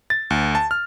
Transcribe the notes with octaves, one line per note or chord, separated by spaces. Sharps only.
A6
D2
A5
F6